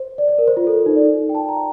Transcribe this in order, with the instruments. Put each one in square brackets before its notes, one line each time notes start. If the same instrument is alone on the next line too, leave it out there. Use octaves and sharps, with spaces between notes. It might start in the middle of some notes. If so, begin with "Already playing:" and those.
Already playing: [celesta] C5
D5
D5
A#4
C5
F4
A4
C5
D#4
D5
G5
A5
A#5